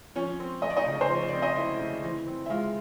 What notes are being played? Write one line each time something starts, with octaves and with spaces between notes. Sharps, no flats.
F3 C#4 C#5
C4
A3 D#5
D5
D#4 D#5
C#3
C5
F3
C#5
C4 D5
D#5
A3 E4 E5
C#3
E3
C4
E5
G#3 F4 F5